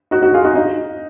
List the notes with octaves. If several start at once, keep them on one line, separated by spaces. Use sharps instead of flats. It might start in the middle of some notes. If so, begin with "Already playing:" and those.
D#4 F#4
D#4 F#4
F4 G#4
D#4 F#4
D#4